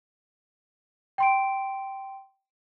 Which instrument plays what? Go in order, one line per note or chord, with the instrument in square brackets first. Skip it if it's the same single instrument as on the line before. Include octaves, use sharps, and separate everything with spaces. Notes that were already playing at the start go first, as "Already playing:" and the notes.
[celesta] G5 C6 D7